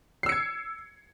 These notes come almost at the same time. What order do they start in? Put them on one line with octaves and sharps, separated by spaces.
C7 E6 C#7 G#6